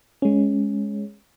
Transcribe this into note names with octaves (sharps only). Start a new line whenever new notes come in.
G#3 C#4